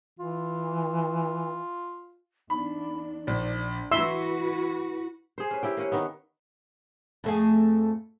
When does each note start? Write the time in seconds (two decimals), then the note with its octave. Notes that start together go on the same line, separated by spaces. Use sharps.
0.19 E3 F4
2.50 E2 D4 D#4 B5
3.27 A#1 D4
3.91 E3 E4 F#4 B4 E5 C6 E6
5.38 G#4 C5
5.51 C#4 B4
5.63 A#3 E4 G4 G5
5.77 A#3 C#4 F#5
5.92 D#3 B3 E5
7.24 F2 A3 G#4